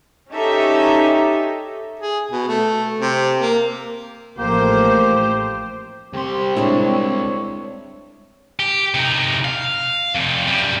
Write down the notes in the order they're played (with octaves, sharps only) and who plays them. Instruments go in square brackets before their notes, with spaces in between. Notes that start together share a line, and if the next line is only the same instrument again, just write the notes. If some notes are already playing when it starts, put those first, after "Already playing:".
[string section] C#4 D#4 G4 A4 E5
[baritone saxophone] G#4
B2
A3
C3
A#3
[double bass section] A1 F3 A3 [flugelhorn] A#3 [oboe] G4 [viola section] C5
[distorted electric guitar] C2 C6 [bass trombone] C4 [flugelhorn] G4
[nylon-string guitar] G#3 D4 E4 [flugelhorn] C#5
[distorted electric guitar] G4
C3 D#4
F5
F2 C3
F#2 G3